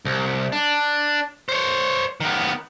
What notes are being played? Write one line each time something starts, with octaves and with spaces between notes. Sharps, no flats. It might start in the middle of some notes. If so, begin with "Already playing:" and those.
C2
D4
C5 C#5
D#3 B3